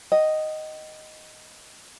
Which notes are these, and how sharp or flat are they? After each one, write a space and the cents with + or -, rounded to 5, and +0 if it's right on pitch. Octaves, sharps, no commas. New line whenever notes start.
D#5 +0 G5 -45